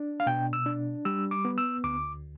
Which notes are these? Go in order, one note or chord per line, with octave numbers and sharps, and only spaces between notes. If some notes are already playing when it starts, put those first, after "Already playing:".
Already playing: D4
F5
B2 G5
E6
D4
G3 E6
D6
B3
E6
D2 D6